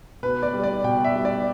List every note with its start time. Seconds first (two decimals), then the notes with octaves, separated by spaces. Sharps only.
0.22 B2 B4
0.43 D5
0.53 G3
0.63 D5
0.84 B2 G5
1.04 E5
1.15 G3
1.25 D5